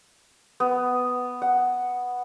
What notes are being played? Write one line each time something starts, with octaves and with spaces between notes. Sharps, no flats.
B3
F#5